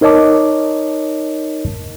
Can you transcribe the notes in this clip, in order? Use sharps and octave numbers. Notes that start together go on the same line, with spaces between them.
D#4 A#4 C#5 D#5 A5 D6